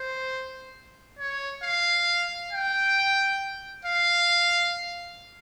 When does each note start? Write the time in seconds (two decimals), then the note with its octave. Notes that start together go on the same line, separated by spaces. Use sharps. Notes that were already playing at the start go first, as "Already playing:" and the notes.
Already playing: C5
1.19 C#5
1.63 F5
2.53 G5
3.85 F5